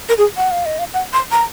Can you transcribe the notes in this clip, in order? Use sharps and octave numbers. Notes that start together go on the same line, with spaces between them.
A#4
G#4
F#5
F5
D#5
F5
F#5
C6
A#5